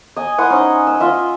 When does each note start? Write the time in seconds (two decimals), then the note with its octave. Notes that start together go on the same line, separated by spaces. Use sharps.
0.16 D#5 G#5
0.38 E4 C5 F#5 D#6
0.50 C#4 D#4 D#5
0.87 E6
1.00 F4 D#5 E5